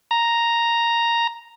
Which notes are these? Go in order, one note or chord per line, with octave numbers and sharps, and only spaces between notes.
A#5